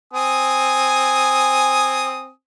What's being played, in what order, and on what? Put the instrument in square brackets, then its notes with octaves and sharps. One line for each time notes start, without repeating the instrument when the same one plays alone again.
[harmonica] C4 G#5 D#6